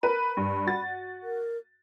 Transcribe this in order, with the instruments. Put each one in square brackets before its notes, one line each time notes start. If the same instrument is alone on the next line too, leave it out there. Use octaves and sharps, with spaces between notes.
[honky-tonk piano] A#4 B4 D#7 [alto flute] B5
[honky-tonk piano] G2
F#4 A6
[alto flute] A#4